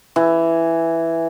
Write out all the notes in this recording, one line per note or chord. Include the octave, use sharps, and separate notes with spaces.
E3